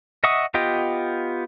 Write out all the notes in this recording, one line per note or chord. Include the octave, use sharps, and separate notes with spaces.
D#5 E5 F#5 C#6 D#6
B3 F4 G4 D#5 G5